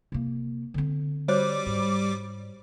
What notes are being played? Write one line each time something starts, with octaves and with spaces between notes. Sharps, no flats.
C3 A#3
D3 C4
G3 F#4 C5 C#5 D6
G#2